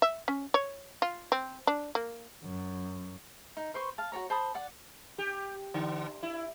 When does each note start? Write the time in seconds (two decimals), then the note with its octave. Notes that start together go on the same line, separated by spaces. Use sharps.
0.02 E5
0.28 C#4
0.54 C#5
1.02 F4
1.32 C4
1.67 D4
1.95 A#3
2.43 F#2
3.57 D#4
3.74 B4 C5 C6 C#6
3.98 F5 A5
4.12 F#4 A4 C#5 A#5
4.30 C5 A5 B5 D#6
4.54 D5 F#5
5.18 G4
5.74 D3
6.23 E4